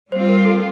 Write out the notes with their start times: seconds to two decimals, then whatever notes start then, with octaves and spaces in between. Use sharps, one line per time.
0.12 G3 C4 F4 C5
0.29 A#4
0.45 A4